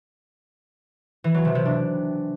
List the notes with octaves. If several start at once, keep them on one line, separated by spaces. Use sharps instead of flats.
E3
F#3
C3
C3
D4